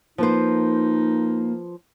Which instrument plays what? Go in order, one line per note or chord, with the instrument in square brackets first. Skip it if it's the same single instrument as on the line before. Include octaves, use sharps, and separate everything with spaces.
[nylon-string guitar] F3 B4 C5 [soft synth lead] A#3 [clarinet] D#4